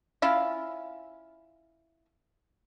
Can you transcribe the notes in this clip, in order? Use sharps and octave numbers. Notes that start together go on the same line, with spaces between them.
C#4 E4 F4 F5